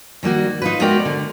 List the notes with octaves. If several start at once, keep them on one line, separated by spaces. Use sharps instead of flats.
D#3 G3 A#3 F#4
D#4 F4 B4
G#3 B3 F#4 A#4 D5 G5
D3